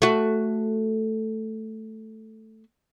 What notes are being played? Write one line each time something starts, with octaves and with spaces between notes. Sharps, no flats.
A3 F#4